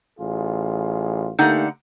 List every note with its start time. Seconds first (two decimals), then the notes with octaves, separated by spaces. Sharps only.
0.19 A1 F4 G#4
1.39 D3 A3 A#3 D#4 G4 F#5